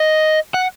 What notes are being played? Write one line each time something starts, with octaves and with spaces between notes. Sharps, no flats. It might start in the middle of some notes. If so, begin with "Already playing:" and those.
Already playing: D#5
F#5